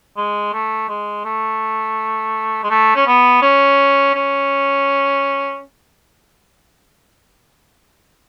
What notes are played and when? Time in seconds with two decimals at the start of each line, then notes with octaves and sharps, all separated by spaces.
0.17 G#3
0.53 A3
0.89 G#3
1.25 A3
2.64 G#3
2.70 A3
2.96 C#4
3.07 B3
3.42 C#4
4.15 C#4